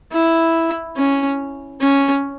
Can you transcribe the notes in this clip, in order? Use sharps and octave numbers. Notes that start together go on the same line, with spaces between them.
E4
C#4
C#4